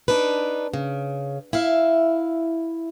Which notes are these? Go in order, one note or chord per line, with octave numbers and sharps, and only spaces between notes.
D4 D#4 B4
C#3
E4 E5 F5